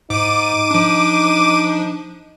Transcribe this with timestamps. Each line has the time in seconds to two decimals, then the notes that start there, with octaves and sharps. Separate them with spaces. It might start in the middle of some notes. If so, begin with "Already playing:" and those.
0.10 G#2 D#4 D6 D#7
0.71 F3 D4